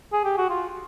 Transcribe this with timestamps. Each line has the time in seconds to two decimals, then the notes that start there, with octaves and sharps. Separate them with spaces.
0.13 G#4
0.24 G4
0.38 F#4
0.50 F4